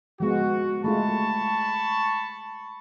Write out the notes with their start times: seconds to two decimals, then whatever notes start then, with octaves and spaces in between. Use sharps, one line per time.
0.20 F3 G#3 B3 F#4
0.84 G#3 A3 F4 A5 B5 C#6